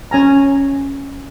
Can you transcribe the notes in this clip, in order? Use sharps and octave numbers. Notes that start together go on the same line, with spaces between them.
C#4 G#5 A#5